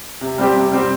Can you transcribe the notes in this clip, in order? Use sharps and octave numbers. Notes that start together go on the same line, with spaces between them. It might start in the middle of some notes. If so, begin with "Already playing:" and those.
C3
G3 C4 G4
C3
G3 C4 G4